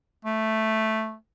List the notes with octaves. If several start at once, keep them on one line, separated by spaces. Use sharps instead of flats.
A3